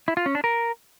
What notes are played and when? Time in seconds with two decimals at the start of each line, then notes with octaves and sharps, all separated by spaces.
0.08 E4
0.17 F4
0.26 C#4
0.35 D4
0.44 A#4